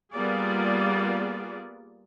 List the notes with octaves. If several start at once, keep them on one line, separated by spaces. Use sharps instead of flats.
G3 A#3 B3 F4 G#4 D5